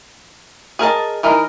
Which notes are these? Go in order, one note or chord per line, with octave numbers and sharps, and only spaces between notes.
G#4 A#4 D#5 A5
E3 D#4 A#4